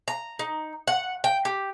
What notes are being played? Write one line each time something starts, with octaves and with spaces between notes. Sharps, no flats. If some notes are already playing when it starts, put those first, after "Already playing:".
A#5
D#4
F#5
G5
G4